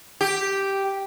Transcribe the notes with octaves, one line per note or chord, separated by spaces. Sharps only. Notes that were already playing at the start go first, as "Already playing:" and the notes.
G4